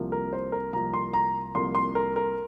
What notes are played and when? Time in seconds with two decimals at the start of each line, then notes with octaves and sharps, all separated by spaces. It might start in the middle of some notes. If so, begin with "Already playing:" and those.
Already playing: C2 C3 F3 A#3
0.12 A#4
0.33 C5
0.52 A#4
0.73 C2 C3 F3 A#3 A#5
0.94 C6
1.13 A#5
1.55 C2 C3 F3 A#3 C6
1.75 C6
1.95 A#4
2.16 A#4